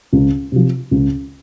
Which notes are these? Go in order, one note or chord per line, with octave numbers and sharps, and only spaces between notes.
C#2
C3 F3
C#2